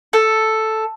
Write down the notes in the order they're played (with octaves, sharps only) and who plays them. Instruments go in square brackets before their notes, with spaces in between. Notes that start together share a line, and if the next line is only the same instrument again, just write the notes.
[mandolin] A4